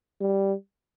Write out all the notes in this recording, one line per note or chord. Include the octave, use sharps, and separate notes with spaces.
G3